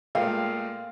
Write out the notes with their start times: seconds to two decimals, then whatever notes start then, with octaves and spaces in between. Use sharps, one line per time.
0.15 A#2 G#3 A3 A#4 B4 F5 G5